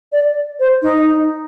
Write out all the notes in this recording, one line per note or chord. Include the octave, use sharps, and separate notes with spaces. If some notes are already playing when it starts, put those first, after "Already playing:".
D5
C5
D#4